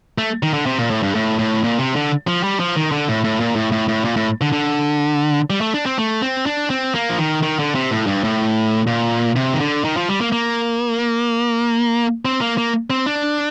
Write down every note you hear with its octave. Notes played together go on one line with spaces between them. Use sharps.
A3
D#3
D3
C3
A#2
A2
G2
A2
A2
A#2
C3
D3
F3
G3
F3
D#3
D3
A2
A2
A#2
A2
A2
A2
A#2
A2
D3
D3
G3
A3
D4
C4
A3
C4
D4
C4
A#3
F3
D#3
D#3
D3
C3
A2
G2
A2
A#2
C3
D#3
D3
D#3
F3
G3
A#3
A#3
C4
A#3
A#3
C4
D4